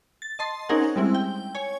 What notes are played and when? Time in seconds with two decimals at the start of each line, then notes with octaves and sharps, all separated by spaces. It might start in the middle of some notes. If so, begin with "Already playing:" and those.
0.22 A6
0.39 D#5 A5 C6
0.69 C4 C#4 D#4 G#4 A#4 F#5
0.96 G3 G#3 C4 E4
1.15 G5
1.55 C#5 G#5